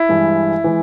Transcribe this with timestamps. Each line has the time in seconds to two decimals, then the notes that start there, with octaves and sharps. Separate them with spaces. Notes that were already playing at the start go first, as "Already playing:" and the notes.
Already playing: E4
0.09 G2 E3 G#3
0.64 E3 G#3